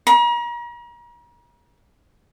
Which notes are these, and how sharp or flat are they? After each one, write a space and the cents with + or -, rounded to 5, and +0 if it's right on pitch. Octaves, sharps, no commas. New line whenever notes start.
A#5 +40